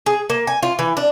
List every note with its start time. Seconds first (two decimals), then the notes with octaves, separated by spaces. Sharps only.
0.06 G#4
0.30 A#3
0.47 G#5
0.63 F4
0.79 E3
0.97 D4